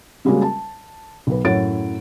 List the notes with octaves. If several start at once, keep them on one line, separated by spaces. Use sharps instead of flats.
C#3 G3 G#3 A#3 C#4 F#4
A5
B1 B4
F#2 A2 C#5 F#5 A6 D7